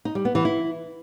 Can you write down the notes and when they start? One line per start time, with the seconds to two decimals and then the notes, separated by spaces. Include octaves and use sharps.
0.05 D#4
0.15 G3
0.25 B3
0.35 E3
0.45 E4